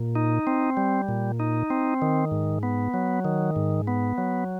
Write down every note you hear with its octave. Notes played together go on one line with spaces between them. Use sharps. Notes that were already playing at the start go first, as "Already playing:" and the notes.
Already playing: A#2
D#4
C4
G3
A#2
D#4
C4
D#3
G#2
B3
F#3
D#3
G#2
B3
F#3